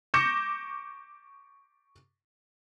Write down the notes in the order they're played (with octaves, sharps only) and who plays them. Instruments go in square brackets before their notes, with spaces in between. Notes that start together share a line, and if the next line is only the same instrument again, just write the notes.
[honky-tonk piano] C#6 D6 G6 A#6 C#7 E7